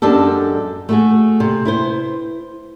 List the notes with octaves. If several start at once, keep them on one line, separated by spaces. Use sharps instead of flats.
F#2 G#3 D4 G4 A4
A3 F#4 G#4
C3
E4 B4 C5